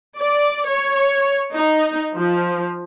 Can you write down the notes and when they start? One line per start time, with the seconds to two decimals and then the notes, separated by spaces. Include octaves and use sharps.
0.17 D5
0.68 C#5
1.55 D#4
2.13 F3